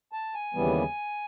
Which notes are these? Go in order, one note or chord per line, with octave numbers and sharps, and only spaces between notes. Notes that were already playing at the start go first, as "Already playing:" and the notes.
A5
G#5
D#2 C#3 E3 G3 B3